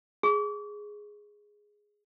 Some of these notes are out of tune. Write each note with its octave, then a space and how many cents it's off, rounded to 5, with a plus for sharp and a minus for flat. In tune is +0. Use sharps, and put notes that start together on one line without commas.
G#4 +0 C#6 -10